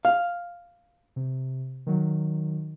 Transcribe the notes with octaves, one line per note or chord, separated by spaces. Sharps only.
F5
C3
D#3 F#3